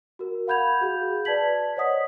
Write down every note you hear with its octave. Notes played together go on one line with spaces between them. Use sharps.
F#4 A#4
F5 F#5 B5 G6 G#6 F7
F#4 G#4 G6
B4 D5 A5 G#6 B6 F#7
C5 C#5 D#5 F#5 D#6 B6